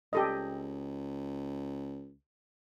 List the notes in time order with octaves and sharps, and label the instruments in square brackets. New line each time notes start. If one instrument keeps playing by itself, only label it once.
[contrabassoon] C#2 [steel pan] G4 A4 D#5